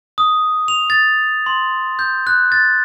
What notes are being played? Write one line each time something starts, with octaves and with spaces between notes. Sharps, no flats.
D#6
F7
A6
C6
G6
F#6
A6